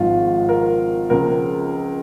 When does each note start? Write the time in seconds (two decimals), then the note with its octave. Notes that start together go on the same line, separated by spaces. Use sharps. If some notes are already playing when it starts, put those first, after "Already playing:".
Already playing: G#1 G#2 F3 F4
0.49 A#4
1.10 C#2 C#3 F3 A#4